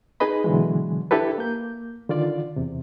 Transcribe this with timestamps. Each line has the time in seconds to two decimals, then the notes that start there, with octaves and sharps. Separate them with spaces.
0.20 D#4 G#4 B4 D#5 B5
0.44 B2 D3 E3 F#3 G#3
1.11 D4 E4 G4 A4 B4
1.38 A#3 G6
2.09 D3 D#3 F4 D5
2.56 E2 C3